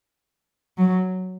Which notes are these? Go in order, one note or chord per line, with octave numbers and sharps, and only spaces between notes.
F#3